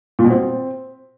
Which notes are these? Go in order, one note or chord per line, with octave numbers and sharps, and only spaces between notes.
A#2
B2
C4